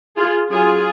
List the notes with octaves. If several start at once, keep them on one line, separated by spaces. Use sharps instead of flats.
F4 G#4
F#3 C#4 F4 G#4